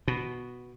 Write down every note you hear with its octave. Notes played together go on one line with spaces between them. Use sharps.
B2